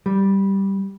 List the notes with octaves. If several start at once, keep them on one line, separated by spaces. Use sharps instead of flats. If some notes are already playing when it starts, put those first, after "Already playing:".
G3